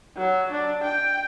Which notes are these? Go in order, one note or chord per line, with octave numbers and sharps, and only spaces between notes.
F#3
D4
G5